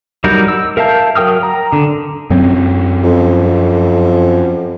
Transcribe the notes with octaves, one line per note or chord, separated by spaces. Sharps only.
F#3 G3 D#4 A#4 G6
E6
A#4 E5 F5 A5 G6
F#3 A#4 G5 D#6 F6
A#5
D3
F#2 F#3 C4
F2